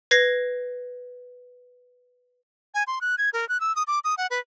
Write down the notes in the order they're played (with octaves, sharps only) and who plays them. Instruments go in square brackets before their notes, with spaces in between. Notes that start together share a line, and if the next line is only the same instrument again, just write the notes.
[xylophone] B4 G#6 A#6 C7
[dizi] G#5
C6
F#6
G#6
A#4
F#6
E6
D#6
D6
D#6
F#5
B4